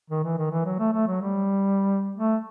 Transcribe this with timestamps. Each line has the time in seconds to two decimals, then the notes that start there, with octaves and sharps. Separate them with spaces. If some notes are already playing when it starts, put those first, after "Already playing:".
0.10 D#3
0.23 E3
0.38 D#3
0.51 E3
0.66 F#3
0.79 A3
0.93 A3
1.07 F#3
1.21 G3
2.17 A3